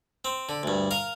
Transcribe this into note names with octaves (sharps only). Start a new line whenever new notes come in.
C4
D3
D2 G2
A#4 F5